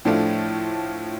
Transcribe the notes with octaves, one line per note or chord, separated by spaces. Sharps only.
A2 F3 A3 D4 F4